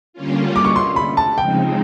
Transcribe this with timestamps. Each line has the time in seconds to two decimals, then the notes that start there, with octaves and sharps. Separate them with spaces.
0.13 D3 G3 A#3 C#4 F4
0.56 D6
0.65 C#6
0.76 C6
0.96 B5
1.17 A5
1.38 C#3 F3 G#3 C4 D#4 G5